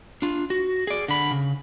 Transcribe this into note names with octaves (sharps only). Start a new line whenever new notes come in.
D4 F4
F#4
G#4 D5
D3 B5
C#3